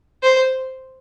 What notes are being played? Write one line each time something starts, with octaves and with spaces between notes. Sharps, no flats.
C5